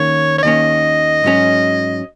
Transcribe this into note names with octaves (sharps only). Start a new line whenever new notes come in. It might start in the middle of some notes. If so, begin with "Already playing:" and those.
Already playing: D#2 D#3 A#3 C#4 C#5
C#5
D#2 D#3 A#3 C#4 D#5
G#2 F#3 C#4